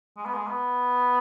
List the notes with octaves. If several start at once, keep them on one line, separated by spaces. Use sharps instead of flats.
G#3
B3
G#3
B3